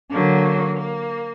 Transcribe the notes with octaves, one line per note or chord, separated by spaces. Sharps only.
D3 F#3 A#3
A#3